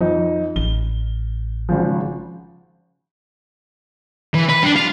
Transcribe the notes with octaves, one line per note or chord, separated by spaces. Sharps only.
F2 F3 D#4
A1 G7
G#1 C#3 F3
E3
B4
D4
F4